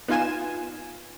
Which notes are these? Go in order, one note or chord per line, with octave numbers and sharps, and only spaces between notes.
B3 D#4 F4 G#5 E7